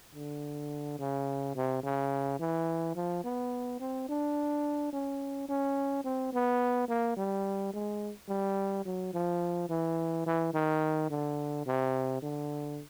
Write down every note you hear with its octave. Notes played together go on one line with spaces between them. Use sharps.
D3
C#3
C3
C#3
E3
F3
B3
C4
D4
C#4
C#4
C4
B3
A#3
G3
G#3
G3
F#3
F3
E3
E3
D#3
D3
C3
D3